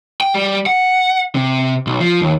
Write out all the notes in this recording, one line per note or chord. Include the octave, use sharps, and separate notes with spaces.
G5
G3
F#5
C3
B1
F3
D#2